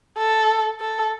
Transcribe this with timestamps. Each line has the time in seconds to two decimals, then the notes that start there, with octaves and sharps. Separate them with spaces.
0.18 A4
0.81 A4